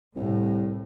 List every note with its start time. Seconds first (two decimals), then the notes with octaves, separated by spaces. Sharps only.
0.16 C2 A2